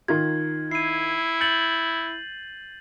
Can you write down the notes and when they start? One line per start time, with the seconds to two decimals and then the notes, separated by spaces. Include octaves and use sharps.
0.08 D#3 F4 G#6
0.71 E4 C7 D#7
1.41 G6 A6 C#7 F#7